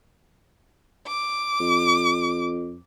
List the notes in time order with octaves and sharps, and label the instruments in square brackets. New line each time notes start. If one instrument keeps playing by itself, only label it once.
[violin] D6
[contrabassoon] F2